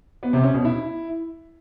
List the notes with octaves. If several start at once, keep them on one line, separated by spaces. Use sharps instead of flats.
B3
C3
C#4
B2
E4